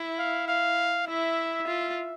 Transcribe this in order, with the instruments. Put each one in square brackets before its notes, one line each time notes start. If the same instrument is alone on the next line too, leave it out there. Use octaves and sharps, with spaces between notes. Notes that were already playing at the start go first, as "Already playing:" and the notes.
Already playing: [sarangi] E4
[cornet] F5
F5
[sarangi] E4 [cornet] E5
[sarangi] F4